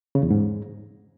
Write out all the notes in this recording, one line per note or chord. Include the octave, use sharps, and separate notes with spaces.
C#3
E2
G#2